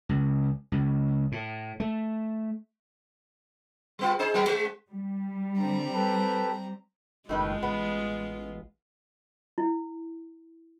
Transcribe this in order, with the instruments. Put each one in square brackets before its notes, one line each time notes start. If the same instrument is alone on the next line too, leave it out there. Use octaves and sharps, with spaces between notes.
[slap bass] C#2
C#2
A2
A3
[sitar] G3 B3 F4
D#4 G#4 C5
F#3 B3 A#4
G#3
[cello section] G3
[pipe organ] D3 [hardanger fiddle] C4 A#5
[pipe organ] G4 A4 B4
[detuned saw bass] F#1 [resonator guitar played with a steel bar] A2 D#3 B4 [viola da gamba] G#3 F4
[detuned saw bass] A1 [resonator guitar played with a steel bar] B3
[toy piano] E4